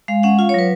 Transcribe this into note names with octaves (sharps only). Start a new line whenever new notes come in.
G#3 F5
C#4 F#5
F4 F5
C#5
F#3 B4